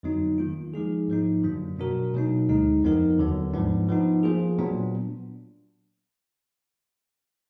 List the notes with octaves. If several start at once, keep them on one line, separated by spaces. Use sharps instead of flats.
F2 D3 F#3 B3 D#4
D#3 A#3 F4
F3 G#3 D#4 G#4
G#2 F3 A#3 D#4
F#2 D3 F#3 A#3 D4
B2 F#3 D4 F#4 A#4
B2 F#3 A#3 D#4
D2 D3 G#3 D#4
F2 F3 B3 D#4 A#4
D#2 D3 F#3 B3
G#2 F3 B3 D4
F3 B3 D#4
F3 A#3 F4 G#4
A#2 F#3 B3 D4